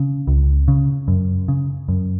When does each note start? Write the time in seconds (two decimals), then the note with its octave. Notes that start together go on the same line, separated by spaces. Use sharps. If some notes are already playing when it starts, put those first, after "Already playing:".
Already playing: C#3
0.27 C#2
0.68 C#3
1.08 F#2
1.48 C#3
1.88 F#2